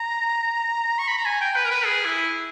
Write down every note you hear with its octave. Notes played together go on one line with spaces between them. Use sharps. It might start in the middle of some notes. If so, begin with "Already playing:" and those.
Already playing: A#5
C#6
B5
A#5
G#5
G5
B4
A#4
B4
G#4
E4